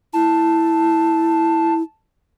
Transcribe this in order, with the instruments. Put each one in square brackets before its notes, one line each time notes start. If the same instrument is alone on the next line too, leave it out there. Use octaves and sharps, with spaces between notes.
[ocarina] E4 [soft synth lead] A5